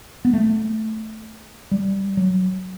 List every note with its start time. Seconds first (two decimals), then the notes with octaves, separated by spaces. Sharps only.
0.25 B3
0.33 A3
1.71 G3
2.17 F#3